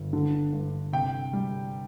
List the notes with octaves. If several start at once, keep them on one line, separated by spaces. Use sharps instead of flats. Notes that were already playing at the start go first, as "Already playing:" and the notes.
Already playing: G1
D3
G2
C3 G5
G3